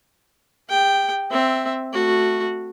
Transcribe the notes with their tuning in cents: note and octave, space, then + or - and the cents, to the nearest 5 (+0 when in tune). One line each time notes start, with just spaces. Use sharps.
G4 +45 G5 +0
C4 +0 E5 +0
A3 +0 F#4 -10